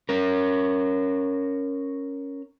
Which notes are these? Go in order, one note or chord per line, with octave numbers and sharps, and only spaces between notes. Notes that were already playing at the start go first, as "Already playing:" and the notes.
C#4 A#4